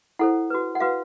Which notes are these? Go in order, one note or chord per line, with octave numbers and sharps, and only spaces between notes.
E4 A4 C5 F#5
F#4 B4
F#5
F#4 B4 F5